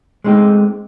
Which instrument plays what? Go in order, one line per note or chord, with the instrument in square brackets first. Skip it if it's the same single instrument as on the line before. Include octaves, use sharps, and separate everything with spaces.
[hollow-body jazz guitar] G#3 A3 C4 D#4 G4